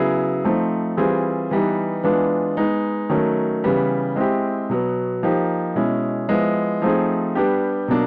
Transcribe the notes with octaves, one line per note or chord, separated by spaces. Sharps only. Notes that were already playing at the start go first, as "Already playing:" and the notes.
Already playing: C#3 F#3 B3 E4 G#4
F3 A3 C4 D#4
E3 G3 C4 F4 G#4
E3 G3 B3 D#4
E3 G#3 B3 D4 F4
G#3 B3 D#4
D#3 F#3 A3 C#4
C#3 E3 G3 B3
G#3 C4 E4 G4
B2 F#3 B3
F3 A#3 D#4 G4
B2 G#3 C#4 E4
F3 G#3 B3 E4
F3 A3 C4 D#4 G#4
G3 B3 D4 G4
B2 F#3 A#3 D4